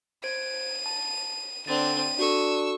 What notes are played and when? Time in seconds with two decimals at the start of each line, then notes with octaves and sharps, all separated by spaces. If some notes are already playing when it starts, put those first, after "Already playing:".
0.24 C5 G#6 D7 D#7
0.86 A5
1.67 D3 C4 D4 A6 D#7
2.19 D4 F#4 A4 C#6 E6